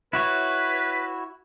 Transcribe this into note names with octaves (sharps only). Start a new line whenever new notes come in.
E4 F#4 B4 C#5